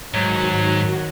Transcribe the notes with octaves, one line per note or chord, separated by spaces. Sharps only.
G#2 D#3 F#3 F#4